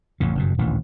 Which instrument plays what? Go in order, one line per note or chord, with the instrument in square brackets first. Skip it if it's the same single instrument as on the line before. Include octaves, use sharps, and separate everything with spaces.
[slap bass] A1 F2 C#3
F#1 G2 B2
D#1 A1 D2 E3